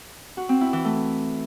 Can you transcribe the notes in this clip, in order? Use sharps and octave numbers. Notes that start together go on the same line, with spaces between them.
F#4
C4
E4
E3
A3